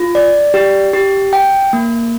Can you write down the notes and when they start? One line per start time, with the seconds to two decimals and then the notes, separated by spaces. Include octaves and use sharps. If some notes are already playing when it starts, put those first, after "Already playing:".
Already playing: F4
0.15 D5
0.54 G4
0.93 G4
1.33 G5
1.73 A#3